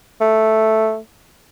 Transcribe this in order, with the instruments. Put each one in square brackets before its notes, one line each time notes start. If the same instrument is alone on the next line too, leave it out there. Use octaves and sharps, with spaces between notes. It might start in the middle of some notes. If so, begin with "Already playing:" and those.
[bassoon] A3